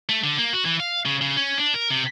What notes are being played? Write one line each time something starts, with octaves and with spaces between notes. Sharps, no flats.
A3
D3
A#3
F#4
E3
F5
C#3
C#3
C#4
D4
A#4
C3